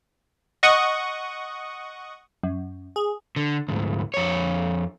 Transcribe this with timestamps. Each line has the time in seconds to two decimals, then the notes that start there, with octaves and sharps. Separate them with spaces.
0.63 D#5 F#5 C#6 D#6
2.43 F#2
2.96 G#4
3.36 D3
3.68 D2 G#2
4.14 F2 C#5